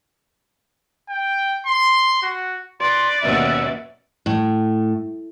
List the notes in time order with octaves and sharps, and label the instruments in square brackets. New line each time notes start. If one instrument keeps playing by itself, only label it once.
[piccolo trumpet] G5
C6
F#4
[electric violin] B4 D5 [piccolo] C6
[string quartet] D#2 B2 C#4 [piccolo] E5
[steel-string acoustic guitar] A2